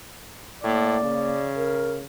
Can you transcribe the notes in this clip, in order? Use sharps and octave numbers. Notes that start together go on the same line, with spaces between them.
A2 A#3 D5
C#3
A#4